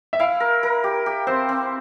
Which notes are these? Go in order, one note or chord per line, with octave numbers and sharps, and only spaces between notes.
E5
E4 F5
A#4
A#4
G4
G4
C4 C5
C4